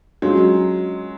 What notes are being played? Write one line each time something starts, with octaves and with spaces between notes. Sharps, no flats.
F#3 G#3 C#4 F4